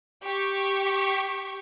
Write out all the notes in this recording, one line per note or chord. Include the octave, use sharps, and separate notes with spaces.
G4 C#6